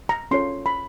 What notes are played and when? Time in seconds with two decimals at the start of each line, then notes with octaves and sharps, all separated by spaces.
0.09 A#5
0.31 C#4 F4 A4 C#5 C6
0.66 B5